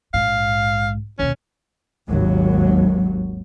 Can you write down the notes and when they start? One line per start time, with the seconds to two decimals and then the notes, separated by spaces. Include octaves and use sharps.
0.14 A#1 G#2 F5
1.19 D#2 B2 C#4
2.09 G#1 D#2 F#3